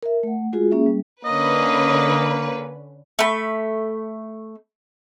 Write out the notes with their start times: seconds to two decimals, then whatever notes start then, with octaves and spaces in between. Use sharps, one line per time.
0.03 A#4 E5
0.23 A3 F#5
0.53 G#3 F4 F#4 G#4
0.71 A#3 C#4 G#4 E5
0.86 G3
1.25 D3 A#3 C#4 B4 D#5
3.19 A3 B5